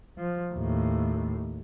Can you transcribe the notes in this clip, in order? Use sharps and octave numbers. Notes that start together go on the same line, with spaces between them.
F3
D#2 A2